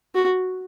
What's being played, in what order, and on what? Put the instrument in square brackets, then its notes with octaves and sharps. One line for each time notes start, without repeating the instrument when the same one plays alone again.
[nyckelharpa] F#4